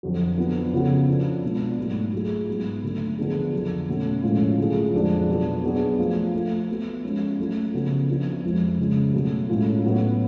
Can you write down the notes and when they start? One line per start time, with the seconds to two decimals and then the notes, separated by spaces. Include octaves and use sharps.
0.03 F2 D3 F#3
0.37 F3 B3 D4
0.73 C#3 F3 B3 F#4 A4
1.07 F3 B3 D4
1.43 B2 G#3 B3 D4
1.78 G#2 F#3 A3
2.13 F#3 A3 F4 G#4
2.48 G#2 F#3 B3
2.83 D3 F#3 A3 D4
3.18 D3 F3 B3 D4 G#4
3.53 F2 D3 F#3
3.89 B2 A3 C#4 F#4 A4
4.23 A2 F3 G#3 C#4 F4
4.58 D3 F#3 A3 F4 G#4
4.94 F2 F3 G#3 D4 G#4
5.28 B2 F#3 B3 D4
5.64 F#3 B3 D4 G#4
5.98 F3 A3 F4
6.34 F3 A3 F4 A4
6.69 F3 B3 F#4
7.04 F3 G#3 C#4 F4 A4
7.39 F#3 A3 F4 A4
7.73 C#3 F3 B3 F#4 A4
8.08 F3 B3 D4 F#4
8.44 F2 F3 G#3
8.78 C#3 F3 G#3
9.13 B2 F#3 A3
9.49 A2 G#3 C#4 F4
9.83 A2 F#3 B3